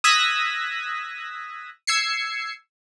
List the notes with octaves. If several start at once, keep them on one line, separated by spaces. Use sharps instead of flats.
D#6 E6 F#6 G#6 A#6 B6
E6 G#6 C7 C#7